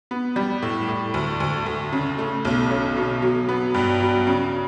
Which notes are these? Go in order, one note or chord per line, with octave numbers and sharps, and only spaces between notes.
B3
G3
A2
A2
D2
D2
D2
C#3
A3
B1
C#4
B2
F#3
B3
G2
F#3
C#3